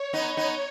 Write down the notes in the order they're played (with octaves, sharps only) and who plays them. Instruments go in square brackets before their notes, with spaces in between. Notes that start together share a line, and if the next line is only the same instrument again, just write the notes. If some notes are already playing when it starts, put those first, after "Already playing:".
Already playing: [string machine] C#5
[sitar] B3 D#4
B3 D#4